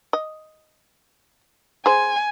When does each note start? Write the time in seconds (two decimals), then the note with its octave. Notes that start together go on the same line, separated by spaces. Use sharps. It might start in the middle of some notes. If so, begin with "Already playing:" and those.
0.13 D#5
1.86 G#4 C5 G#5